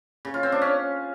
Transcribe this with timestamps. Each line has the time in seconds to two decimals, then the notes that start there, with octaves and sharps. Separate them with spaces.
0.25 C#3
0.34 F4
0.43 C4
0.52 D4
0.62 C#4